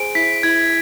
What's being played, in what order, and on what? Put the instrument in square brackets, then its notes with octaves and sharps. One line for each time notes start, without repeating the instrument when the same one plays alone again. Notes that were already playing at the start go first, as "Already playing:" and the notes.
Already playing: [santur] G#4 C5 [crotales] D7
[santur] E4 [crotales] B6
[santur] E4 [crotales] G#6